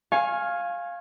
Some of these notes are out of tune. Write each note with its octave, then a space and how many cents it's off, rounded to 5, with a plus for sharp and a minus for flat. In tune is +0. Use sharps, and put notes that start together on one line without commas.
F5 +0 G#5 +0 C#6 -35